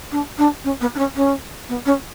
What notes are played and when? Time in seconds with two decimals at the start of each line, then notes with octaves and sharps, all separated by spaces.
0.12 D4
0.38 D4
0.64 C#4
0.81 B3
0.95 D4
0.99 C#4
1.16 C#4
1.69 B3
1.86 C#4